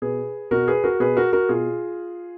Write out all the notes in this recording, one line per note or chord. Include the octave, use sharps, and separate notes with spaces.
B2 G#4 B4
B2 F#4 A#4
G#4 B4
F#4 A#4
B2 G#4 B4
F#4 A#4
F#4 A#4
B2 F4 G#4